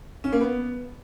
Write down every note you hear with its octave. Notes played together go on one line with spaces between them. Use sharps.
C#4
A#3
B3